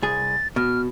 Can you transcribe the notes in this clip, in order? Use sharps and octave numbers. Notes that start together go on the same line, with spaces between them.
C2 G#4 A6
B2 F6